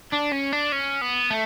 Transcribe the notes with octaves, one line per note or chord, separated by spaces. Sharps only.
D4
C#4
D4
C#4
B3
A3